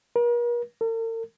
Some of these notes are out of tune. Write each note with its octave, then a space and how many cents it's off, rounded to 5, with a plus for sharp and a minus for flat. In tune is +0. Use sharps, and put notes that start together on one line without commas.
A#4 +45
A#4 -45